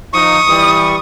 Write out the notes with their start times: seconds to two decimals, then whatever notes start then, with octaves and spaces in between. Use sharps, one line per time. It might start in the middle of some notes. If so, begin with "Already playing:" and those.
0.13 F3 D#4 C#6 D#6
0.47 E3 G3